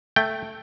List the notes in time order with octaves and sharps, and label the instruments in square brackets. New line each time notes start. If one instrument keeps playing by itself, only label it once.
[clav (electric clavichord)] A3 G5